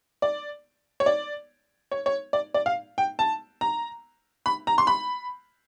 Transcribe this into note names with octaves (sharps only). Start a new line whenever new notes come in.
D5
C#5
D5
C#5
C#5
D5
D5
F5
G5
A5
A#5
B5
A#5
C6
B5